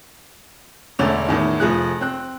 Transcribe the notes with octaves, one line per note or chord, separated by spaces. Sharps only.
E1 D3 A3 C#4
E2 A2 D#3
F1 F3 G#4 F#6
C4 F#6